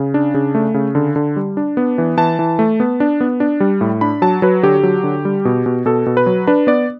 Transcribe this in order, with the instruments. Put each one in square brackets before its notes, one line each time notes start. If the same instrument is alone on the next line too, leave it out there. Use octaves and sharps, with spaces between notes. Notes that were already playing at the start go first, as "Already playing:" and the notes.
Already playing: [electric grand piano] C#3
D4
C#3
A3
C#3
D3
D3
G3
D4
B3
E3
E3 A5
E3
A3
B3
D4
B3
D4
G3
A2
D4 B5
F#3 A5
F#3 B4
D3 G4
F#3
D3
G3
B2
B2
B2 A4
B2
B4
F#3
D4 B4
B3 D5